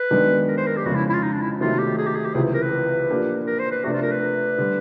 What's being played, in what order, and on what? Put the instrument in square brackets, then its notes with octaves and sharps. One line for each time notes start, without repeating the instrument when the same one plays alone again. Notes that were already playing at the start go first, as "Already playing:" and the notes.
Already playing: [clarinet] B4
[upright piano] F#2 D#3 G#3 B3 D4
[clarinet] A#4
C5
A#4
G4
[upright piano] F2 C#3 F3 G#3 [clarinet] F#4
[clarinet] E4
E4
F4
D#4
D4
E4
[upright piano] C3 D#3 F#3 A3 [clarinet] F4
[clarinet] G4
G#4
G4
G#4
G4
[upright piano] C#2 C3 E3 [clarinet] G#4
[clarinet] A#4
B4
[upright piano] A#2 F3 A#3 D4 G4
[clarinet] A#4
C5
B4
[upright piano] C3 F3 A3 D4 [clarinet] F#4
[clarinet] F4
A#4
B4
[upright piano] D3 G3